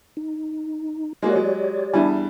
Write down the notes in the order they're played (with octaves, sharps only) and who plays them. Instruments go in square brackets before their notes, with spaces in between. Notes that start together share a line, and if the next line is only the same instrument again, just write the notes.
[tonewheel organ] D#4
[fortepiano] G#3 A#3 F#4 [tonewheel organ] G4 C#5 D5
[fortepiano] F#3 G#3
[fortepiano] E2 G3 [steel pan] D4 E4 G#5